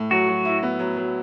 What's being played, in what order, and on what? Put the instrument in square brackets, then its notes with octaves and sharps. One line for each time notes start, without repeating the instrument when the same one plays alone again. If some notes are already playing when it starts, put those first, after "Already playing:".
Already playing: [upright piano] A2
[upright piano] F#3 [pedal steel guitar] F#4
[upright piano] F#3
E4
B3
F#3
F#3